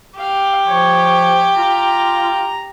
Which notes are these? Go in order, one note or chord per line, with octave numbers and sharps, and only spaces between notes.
G4 F5
F3 C#5
F4 A#5